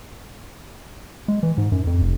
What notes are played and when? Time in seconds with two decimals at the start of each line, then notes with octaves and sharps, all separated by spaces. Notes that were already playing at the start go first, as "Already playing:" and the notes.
1.28 G#3
1.43 E3
1.58 G#2
1.72 F#2
1.87 F2
2.02 F1